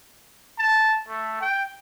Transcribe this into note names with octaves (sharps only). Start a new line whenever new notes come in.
A5
A3
G5